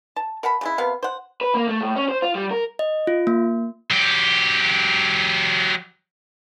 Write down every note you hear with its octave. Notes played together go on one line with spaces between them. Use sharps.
A5
A#4 F#5 A5 B5
C#3 G#3 E4
C3 B3 A#4 F5
C5 F#5
B4
A#3
A3
A2
C#4
C5
F4
G3
A#4
D#5
F4
A#3
F#3 G4